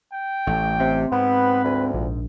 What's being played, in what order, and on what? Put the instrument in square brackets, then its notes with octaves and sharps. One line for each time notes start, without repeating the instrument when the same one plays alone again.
[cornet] G5
[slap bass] A1 [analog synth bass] A3
[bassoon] C3 [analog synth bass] C4
[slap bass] G#2 [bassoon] B3 [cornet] B4
[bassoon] D2
[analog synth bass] A#1